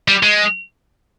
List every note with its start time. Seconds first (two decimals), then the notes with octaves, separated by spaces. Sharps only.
0.08 G3
0.23 G#3